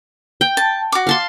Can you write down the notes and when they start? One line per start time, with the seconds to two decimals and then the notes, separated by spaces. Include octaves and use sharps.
0.41 G5
0.57 A5
0.92 F#4 D6
1.07 F5 A5 C6